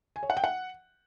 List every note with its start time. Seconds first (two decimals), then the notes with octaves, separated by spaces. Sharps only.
0.16 G#5
0.23 C#5
0.30 F#5
0.37 G5
0.44 F#5